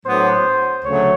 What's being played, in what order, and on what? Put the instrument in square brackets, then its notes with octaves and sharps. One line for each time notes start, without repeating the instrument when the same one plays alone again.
[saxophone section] A2 F#3 B3 D4 [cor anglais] C5
[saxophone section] D2 C#3 F#3 A3 [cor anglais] C#5